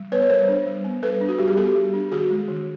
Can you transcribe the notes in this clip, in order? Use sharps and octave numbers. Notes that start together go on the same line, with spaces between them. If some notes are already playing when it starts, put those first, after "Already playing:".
Already playing: G3
B3 B4 C#5
C#5
G3 A#4 C5
D4
G3
B3
G3 A4 B4
D4
F#4
G3 G4
G#4
B3 G4 A4
G3
D4
D#3 F#4 G#4
G#3
D#3